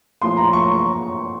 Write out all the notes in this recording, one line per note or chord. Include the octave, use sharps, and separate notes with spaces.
A#2 F3 C6
A#5
C#6